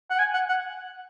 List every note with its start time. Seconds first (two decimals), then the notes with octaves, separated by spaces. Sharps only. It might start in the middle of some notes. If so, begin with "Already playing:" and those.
0.10 F#5
0.19 G#5
0.34 F#5
0.49 F#5